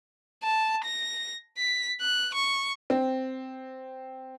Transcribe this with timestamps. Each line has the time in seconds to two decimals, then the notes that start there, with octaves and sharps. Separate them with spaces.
0.43 A5
0.85 A#6
1.58 B6
2.01 F#6
2.34 C#6
2.90 C4